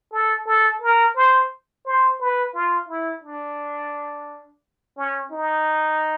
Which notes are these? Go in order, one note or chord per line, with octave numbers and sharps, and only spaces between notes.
A4
A4
A#4
C5
C5
B4
F4
E4
D4
C#4
D#4